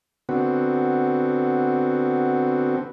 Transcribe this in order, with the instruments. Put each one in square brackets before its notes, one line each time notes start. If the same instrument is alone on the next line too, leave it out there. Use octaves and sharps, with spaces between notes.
[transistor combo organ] D3 B3 C4 F#4